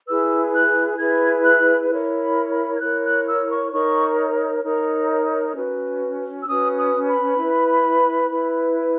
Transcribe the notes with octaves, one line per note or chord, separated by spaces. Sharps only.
E4 G#4 B4 E6
F#6
E4 G#4 B4 G#6
F#6
E4 A#4 C#5
B5
B5
G#6
E4 A#4 C#5 F#6
F#6
E6
C#6
D#4 A#4 C#5 C#6
D#4 A#4 C#5
C#4 F#4 B4
E6
C#4 F#4 B4 D#6
D#6
B5
E4 B4
E4 B4